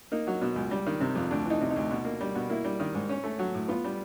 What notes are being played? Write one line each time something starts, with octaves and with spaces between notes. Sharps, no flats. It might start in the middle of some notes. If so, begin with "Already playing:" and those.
A#3 D#4
F#3
B2
C#2
G3
D#3
C3
F2
D2 D4
E3 D#4
C3
D#4
D2
B2
A#3
G3
B2
A#3 E4
G3
D#3
G#2
C#4
A3
F#3
A2
B3 F4
G3